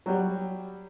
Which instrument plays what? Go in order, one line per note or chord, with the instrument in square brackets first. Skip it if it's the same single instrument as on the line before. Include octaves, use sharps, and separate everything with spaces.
[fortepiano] F#3 G3